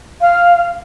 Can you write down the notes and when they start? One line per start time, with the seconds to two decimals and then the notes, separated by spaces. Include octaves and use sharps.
0.21 F5